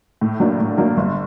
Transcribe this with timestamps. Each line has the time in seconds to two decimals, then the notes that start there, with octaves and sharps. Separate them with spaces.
0.21 A2
0.40 F#3 A#3 D4
0.59 A2
0.77 F#3 A#3 D4
0.97 G1